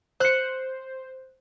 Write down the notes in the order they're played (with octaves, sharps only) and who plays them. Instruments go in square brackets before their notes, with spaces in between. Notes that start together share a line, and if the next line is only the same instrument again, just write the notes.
[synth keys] C5 [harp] F#6 C#7